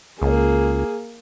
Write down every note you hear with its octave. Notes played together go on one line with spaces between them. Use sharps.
C#2 A#3 G#4